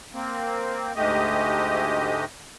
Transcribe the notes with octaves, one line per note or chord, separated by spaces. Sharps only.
A#3 C4
D2 G#2 G#3 A3 G4 D#5